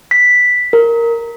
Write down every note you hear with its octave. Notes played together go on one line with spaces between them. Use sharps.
B6
A#4